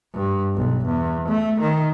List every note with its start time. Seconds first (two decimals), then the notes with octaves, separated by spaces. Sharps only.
0.14 G2
0.56 B1
0.86 E2
1.28 A3
1.60 D#3